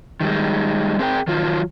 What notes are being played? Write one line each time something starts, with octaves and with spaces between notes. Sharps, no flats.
D#3 G3 G#3
C4 G#4 A#4 G5
D#3 F#3 F4